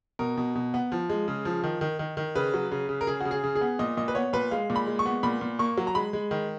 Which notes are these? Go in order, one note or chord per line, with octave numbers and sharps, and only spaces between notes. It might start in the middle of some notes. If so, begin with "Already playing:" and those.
B2 A#4
B2
B2
B3
F3
G#3
C#3
F3
D#3
D#3
D#3
D#3
C#3 B4
F#3
C#3
C#3
A#4
C#3 G#4
C#3 F#4
G#4
C#3
G#4
B3
A#2 D#5
A#2 D#5
B4
B3 C#5
A#2 B4
G#3 F5
A#2
B5
G#3
C#6
B3
A#2 B5
A#2
A#3 C#6
F#3
A#5
G#3 B5
G#3
D#3